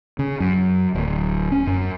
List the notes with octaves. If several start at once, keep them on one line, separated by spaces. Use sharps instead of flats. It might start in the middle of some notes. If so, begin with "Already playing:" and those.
C#3
F#2
D1
C#4
F#2